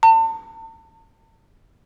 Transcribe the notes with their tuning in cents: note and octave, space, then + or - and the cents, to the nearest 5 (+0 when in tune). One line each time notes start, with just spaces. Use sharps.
A5 +35